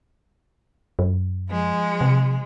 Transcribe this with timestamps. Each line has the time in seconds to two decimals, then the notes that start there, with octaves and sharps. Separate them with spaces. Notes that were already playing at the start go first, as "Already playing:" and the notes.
0.99 F#2
1.48 F3 G#3
2.01 C3